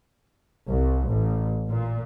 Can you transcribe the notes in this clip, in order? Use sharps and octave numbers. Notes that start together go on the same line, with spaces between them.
C2
A1
A#2